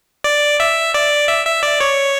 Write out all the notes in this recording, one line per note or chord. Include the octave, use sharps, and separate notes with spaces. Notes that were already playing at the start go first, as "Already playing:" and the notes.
D5
E5
D5
E5
E5
D5
C#5